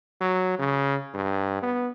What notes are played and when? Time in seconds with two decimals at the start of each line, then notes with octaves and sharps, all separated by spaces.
0.21 F#3
0.59 C#3
1.14 G2
1.62 B3